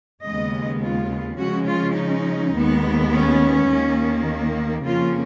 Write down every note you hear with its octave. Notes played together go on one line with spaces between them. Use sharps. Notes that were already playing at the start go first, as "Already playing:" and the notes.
D#2 C#3 G#3 B3 D#5
F4
C#3 F3 G#3 C#4 F#4
F4
D#4
D#2 D#3 G#3 B3
C#4
D#2 D#3 A#3
F2 C#3 F3 A#3 C#4 F4